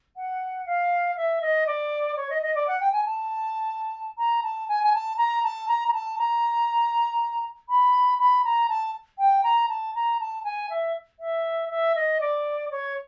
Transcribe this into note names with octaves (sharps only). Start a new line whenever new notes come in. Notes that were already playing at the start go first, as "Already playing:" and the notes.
F#5
F5
E5
D#5
D5
C#5
D#5
D#5
D5
F#5
G5
G#5
A5
A#5
A5
G#5
G#5
A5
A#5
A5
A#5
A#5
A5
A#5
B5
B5
A#5
A5
G5
A#5
A5
A#5
A5
G#5
E5
E5
E5
D#5
D5
C#5